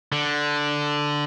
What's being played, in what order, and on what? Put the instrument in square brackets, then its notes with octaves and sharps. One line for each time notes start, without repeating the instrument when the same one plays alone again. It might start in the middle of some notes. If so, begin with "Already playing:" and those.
[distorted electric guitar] D3